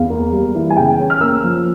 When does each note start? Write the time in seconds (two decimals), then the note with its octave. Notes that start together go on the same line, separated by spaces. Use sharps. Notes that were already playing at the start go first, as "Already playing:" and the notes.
Already playing: E2 F5
0.10 A#3
0.32 G3
0.55 E3
0.70 G#5
0.77 C#3 G5
0.99 C#4
1.10 F6
1.21 A#3 E6
1.43 F3